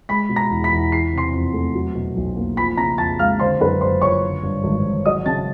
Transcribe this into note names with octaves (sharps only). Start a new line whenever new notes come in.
G#3 B5 B6
B2
A#5 A#6
E2
B5 B6
E2
E3 C7
C3
C6 C7
F2
A3
F#3
B2
B1
A#3
F3 B5 B6
C#3 A#5 A#6
F2 A5 A6
G#3 F5 F6
D3 C5 C6
F#2 B4 B5
F#1 C5 C6
F3 C#5 C#6
D3
G2
G#1
G#1
F#3 D#5 D#6
C#3 A5 A6